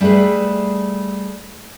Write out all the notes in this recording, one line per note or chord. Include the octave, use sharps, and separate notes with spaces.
G3 A3 G#4 A4 B4